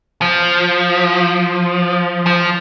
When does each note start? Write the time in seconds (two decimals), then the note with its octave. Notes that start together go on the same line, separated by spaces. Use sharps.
0.22 F3
2.26 F3